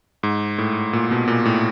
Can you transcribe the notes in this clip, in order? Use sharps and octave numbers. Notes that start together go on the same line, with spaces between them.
G#2
A2
A#2
B2
A#2
A2